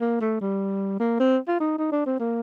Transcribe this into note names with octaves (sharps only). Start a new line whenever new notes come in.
A#3
A3
G3
A#3
C4
F4
D#4
D#4
D4
C4
A#3